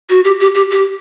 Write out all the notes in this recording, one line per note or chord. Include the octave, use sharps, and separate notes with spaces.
F#4
G4
G4
G4
G4